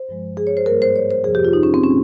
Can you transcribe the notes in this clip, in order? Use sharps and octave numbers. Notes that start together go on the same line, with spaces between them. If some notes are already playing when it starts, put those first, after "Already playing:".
Already playing: C5
G2 F3 G#3
G#4
C#5
C5
G#2 G3 A#3 A#4
C5
C#5
C5
F2 C3 F3 G#4
G4
F4
D#4
C#4
C4
A#2 G3 A#3 C#4